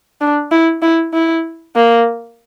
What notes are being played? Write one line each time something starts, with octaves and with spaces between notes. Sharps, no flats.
D4
E4
E4
E4
A#3